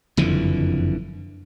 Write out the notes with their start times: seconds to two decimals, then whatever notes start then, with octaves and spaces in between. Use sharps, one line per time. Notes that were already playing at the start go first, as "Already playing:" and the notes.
0.17 F#1 F2 D3 E3